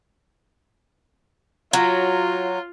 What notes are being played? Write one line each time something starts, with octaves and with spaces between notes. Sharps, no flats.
F#3 F4